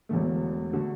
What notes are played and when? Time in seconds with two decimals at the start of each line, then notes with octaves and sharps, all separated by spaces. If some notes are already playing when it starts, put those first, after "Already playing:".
0.09 E1 E2 D3 A3
0.73 D3 A3 F#4